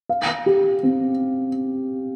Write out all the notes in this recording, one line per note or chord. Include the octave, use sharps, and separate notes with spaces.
F5
G4
C4